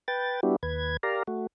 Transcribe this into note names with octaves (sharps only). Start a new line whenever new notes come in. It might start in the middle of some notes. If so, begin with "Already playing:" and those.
B4 G5 A6
G3 B3 D4 E4 F#4 G4
D#2 B4 G#6
G4 A#4 D5 F5 A#5
A3 F#4